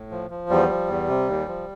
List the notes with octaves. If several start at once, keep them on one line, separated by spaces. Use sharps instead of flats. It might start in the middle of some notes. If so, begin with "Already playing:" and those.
Already playing: A2
F3
F3
E2 G3
F3
E2
C3
D#2
F3